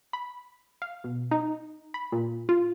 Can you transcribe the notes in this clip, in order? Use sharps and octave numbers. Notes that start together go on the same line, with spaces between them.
B5
F5
B2
D#4
B5
A#2
F4